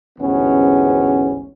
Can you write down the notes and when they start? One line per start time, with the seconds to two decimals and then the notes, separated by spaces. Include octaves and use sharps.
0.19 A1 D2 G#2 E3 B3 C#4